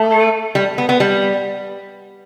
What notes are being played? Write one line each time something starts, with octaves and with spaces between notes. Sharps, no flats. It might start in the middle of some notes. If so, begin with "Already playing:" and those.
Already playing: A3
G3
B3
B3
G3